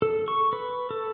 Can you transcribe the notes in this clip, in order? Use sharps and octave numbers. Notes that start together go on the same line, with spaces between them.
A4
C#6
B4
A4